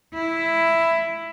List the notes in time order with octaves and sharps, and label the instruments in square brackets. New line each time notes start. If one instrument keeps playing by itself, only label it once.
[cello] E4